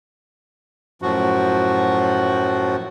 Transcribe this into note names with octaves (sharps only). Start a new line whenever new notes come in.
F#2 A2 F3 F#4